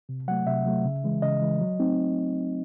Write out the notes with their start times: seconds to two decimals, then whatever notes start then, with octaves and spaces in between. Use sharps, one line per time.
0.09 C3
0.28 F#3 A3 F#5
0.47 C3 E5
0.66 F#3 A3
0.85 C#3
1.04 E3 G#3
1.22 C#3 D#5
1.42 E3 G#3
1.61 F#3
1.79 A3 C4 D#4